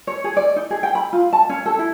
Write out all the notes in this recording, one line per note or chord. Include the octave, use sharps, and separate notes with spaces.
C#5
G#4
D5
D#4
G#4
G5
B5
F4
A5
C#4
A4
E4